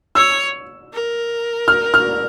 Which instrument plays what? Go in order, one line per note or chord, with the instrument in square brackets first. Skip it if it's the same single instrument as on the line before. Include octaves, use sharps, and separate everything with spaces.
[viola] C#5 [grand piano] E6
[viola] A#4
[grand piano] F6
F6